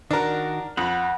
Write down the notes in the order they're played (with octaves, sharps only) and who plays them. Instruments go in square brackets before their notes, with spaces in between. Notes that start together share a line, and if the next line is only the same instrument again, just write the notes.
[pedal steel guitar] D#3 F#4 [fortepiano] D4 A#4
[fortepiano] F2 [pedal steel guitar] F#5 B5